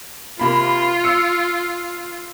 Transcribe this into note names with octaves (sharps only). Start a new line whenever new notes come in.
C3 A#3 F4 B5
E6 C#7